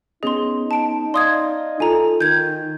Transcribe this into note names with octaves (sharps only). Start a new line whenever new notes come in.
B3 C#4 D#4 G#4 D#5 C6
A5 D7
D5 D#5 F5 C6 D#6 G#6
D#4 F4 A4 G#5 A#5
D#3 G6 G#6